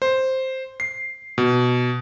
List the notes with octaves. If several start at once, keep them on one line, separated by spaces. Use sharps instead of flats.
C5
C7
B2